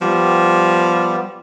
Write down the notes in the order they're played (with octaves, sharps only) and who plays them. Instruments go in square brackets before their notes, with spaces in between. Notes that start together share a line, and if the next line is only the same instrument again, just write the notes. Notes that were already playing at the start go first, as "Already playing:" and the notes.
[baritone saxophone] F3 [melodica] G3 B3 G4